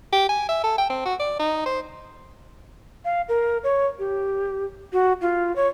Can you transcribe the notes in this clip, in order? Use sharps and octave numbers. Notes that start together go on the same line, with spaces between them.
G4
G#5
E5
A4
G5
C4
F#4
D5
D#4
C5
F5
A#4
C#5
G4
F#4
F4
C#5